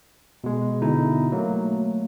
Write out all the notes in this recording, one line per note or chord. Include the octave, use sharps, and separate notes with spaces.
B2 G#3
B2 D3 D#4 E4
F#3 A3 A#3